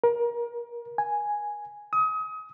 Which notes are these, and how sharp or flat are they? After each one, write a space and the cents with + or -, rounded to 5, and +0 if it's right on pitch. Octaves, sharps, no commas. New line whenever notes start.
A#4 +30
G#5 +0
D#6 +30